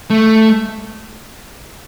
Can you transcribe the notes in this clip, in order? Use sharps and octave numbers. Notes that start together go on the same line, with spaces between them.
A3